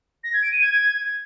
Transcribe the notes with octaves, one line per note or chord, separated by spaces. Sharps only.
A#6
G#6
D7
D#7
G#6